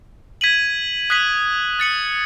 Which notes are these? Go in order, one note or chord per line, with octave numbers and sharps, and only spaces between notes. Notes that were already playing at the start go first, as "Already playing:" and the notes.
G#6 B6 D#7 F#7
D#6 F#6 B6 D#7 F#7
F#6 A6 C#7 F#7